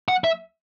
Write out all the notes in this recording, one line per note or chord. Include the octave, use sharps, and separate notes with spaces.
F#5
E5